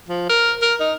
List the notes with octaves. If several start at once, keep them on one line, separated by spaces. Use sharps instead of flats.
F3
A#4
A#4
D#4